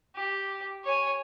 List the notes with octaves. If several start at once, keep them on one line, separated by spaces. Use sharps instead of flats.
G4
C#5 G#5